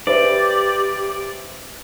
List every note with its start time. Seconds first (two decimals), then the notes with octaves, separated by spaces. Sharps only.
0.07 G4 B4 C5 D5 E5